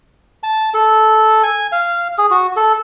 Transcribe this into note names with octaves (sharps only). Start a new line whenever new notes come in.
A5
A4
G#5
F5
G#4
F#4
A4